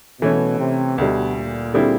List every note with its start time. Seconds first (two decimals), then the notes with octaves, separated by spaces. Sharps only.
0.21 B2 E3 A3 C#4
0.59 C3
0.98 D2 B2 D3 G3
1.36 A#2
1.73 D3 G3 C4 E4 G#4